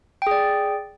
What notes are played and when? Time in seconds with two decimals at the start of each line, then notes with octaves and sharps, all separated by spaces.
0.22 G5
0.27 G#4
0.31 D5